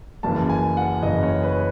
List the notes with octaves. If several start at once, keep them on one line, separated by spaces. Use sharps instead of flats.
F#1 F#2 C#3 E3 A5
G#5
F#5
F#1 F#2 C#3 E3 D#5
C#5
B4